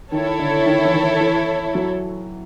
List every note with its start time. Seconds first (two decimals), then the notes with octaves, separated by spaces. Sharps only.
0.12 D#3 E4 A4 C#5
0.39 D3
0.66 D#3
0.85 E3
0.93 D#3
1.21 E3
1.75 F#3